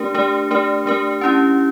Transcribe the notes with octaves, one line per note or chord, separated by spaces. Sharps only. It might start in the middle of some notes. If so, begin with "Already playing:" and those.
Already playing: A3 D4 G4 A#4
A3 D4 G4 A#4
A3 D4 G4 A#4
A3 D4 G4 A#4
C#4 E4 G4